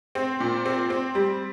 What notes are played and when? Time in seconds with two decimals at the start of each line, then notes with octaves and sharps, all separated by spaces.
0.15 C4
0.40 A#2
0.66 C4
0.90 C4
1.15 G3